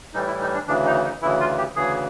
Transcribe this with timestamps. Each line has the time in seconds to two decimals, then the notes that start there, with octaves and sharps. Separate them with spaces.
0.13 A2 E3 G3 D#4
0.27 E4
0.41 D#4
0.54 D4
0.67 D2 C#3 E3 D4
0.86 D#4
1.04 D#4
1.21 D2 C#3 E3 E4
1.40 F4
1.58 G4
1.75 D2 C#3 E3 G#4